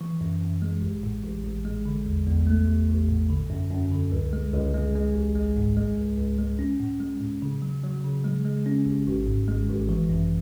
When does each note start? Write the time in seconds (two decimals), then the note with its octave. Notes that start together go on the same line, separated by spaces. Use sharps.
0.01 E3
0.21 F#2
0.41 F#2
0.62 G#3
0.82 A1
1.03 A2
1.24 A1
1.44 A1
1.65 G#3
1.86 D3
2.06 E2
2.27 E2
2.47 A3
2.68 A1
2.89 A1
3.09 A2
3.29 D3
3.50 F#2
3.71 F#2
3.91 D3
4.12 C#2
4.33 G#3
4.54 C#2
4.74 G#3
4.95 G#3
5.15 A1
5.35 G#3
5.56 G#2
5.76 G#3
5.97 C#2
6.18 C#2
6.38 G#3
6.59 C#4
6.80 A2
7.00 G#3
7.21 A2
7.42 C#3
7.62 F#3
7.84 F#3
8.04 C#3
8.24 G#3
8.45 G#3
8.66 C#4
8.86 A1
9.07 G#1
9.27 G#2
9.48 G#3
9.69 G#1
9.89 E3
10.09 F#2